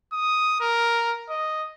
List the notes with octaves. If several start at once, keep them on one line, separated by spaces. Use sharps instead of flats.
D#6
A#4
D#5